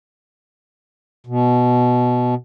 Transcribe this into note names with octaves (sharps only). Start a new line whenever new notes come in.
B2